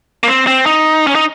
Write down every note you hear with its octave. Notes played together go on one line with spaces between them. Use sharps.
A#3
C4
C4
D#4
C#4
D#4